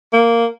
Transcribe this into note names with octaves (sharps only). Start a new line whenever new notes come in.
A#3